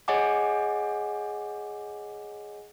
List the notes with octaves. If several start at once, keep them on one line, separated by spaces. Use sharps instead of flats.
G#4 C#5 D#5 F#5 G#5 D6